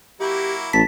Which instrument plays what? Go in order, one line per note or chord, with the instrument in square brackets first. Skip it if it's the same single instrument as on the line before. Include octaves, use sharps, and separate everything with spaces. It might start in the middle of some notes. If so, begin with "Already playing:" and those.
[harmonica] F#3 A#3 E4 [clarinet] G4
[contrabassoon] A1 [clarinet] A5 [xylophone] B6